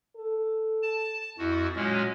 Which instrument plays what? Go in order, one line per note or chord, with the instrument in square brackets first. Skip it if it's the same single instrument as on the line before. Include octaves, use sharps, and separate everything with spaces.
[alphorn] A4
[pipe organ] A5
[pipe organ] F2 F#4 [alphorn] E4
[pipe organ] A#2 G#3 C#4 [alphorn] F#3